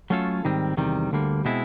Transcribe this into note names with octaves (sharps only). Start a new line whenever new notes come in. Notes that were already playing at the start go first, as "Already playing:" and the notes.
F#3 A3 C#4 F4 A4
G#2 D#3 G3 C4
E2 C3 D#3 G3
D2 D3 G3 A#3
B2 G#3 C4 E4